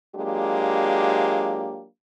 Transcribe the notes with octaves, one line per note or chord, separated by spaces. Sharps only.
F#3 G#3 A#3 D4 F4 G4